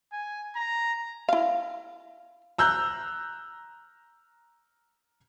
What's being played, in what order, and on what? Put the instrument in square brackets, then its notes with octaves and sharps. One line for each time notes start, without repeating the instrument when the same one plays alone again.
[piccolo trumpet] G#5
A#5
[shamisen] E4 F5
[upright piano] A#5 E6 F#6 G6